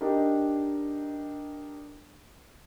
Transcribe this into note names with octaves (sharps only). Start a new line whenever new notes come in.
D4 D#4 G4 A#4